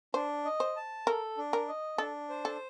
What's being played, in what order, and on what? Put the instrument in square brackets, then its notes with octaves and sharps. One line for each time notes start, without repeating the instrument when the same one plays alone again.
[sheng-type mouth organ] D4 [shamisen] C5
[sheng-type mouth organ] D#5
[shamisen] C5
[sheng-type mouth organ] A5
[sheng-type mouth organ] A4 [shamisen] A#4
[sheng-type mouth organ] D4
[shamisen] A#4
[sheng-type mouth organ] D#5
[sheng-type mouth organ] D4 [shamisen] A4
[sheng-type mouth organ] C5
[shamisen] A4